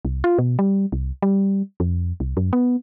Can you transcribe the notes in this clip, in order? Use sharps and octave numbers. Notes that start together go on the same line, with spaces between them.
C2
F4
B2
G3
C2
G3
F2
C2
F#2
B3